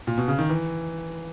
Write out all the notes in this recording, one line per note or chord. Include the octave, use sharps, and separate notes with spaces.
A#2
B2
C#3
D#3
E3